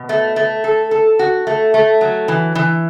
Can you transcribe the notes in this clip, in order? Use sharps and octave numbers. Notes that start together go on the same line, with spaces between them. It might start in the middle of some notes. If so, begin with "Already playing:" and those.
Already playing: B2
A3
A3
A4
A4
F#4
A3
A3
F#3
E3
E3